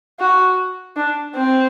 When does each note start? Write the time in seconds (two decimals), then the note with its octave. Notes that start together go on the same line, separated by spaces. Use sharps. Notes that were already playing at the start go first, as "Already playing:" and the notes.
0.19 F#4
0.97 D4
1.35 C4